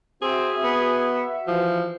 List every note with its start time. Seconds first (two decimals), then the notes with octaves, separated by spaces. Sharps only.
0.22 C4 F#4 G#4 E5
0.64 B3
1.47 E3 F3